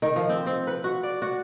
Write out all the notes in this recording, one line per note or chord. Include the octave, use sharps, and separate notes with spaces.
D#3
F3
C4
C4
B4
F#4
D5
F#4